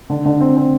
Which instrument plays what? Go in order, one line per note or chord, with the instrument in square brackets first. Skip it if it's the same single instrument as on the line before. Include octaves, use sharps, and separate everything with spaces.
[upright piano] D3
D3
C4
C4